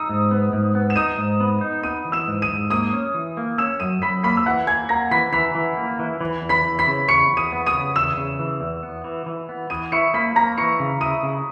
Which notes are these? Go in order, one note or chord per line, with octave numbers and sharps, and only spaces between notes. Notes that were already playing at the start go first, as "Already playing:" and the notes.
Already playing: D#4 D#6 E6
G#2
B3
G#2
B3
E7
D#4 D#6 D#7
G#2
B3
D#4
B3 D#6 D#7
E3
E6 E7
G#2
D#6 D#7
G#2
A#3 D#6 D#7
C#4
E3
A#3
C#4 E6 E7
F#2 D#6 D#7
F#2 B5 B6
A#3 B5 B6
E6
E3 F#5 F#6
A#3 G#5 G#6
A#3 A#5 A#6
E3 B5 B6
E3 B5 B6
E3
A#3
E3
E3
E2
B5 B6
E3
B5 B6
C#3
E2 C#6 C#7
E2
D#6 D#7
B3
D#6 D#7
C#3
E2 E6 E7
C#3
E3
E2
B3
E3
E3
B3
E3 D#6 D#7
E4 C#6 C#7
A#3 B5 B6
A#3 A#5 A#6
E3 C#6 C#7
C#3
E4 D#6 D#7
C#3